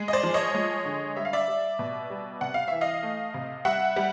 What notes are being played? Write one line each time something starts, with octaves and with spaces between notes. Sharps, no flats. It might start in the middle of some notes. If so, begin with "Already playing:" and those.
Already playing: G#3
D#5
C5 D5
F3
C#5 D#5
G#3
D3
G3 E5
F5
D5 E5
G3
B2
G3
C3 F#5
F5
E3 E5
D#5 F5
A3
C3
G3 E5 F#5
G3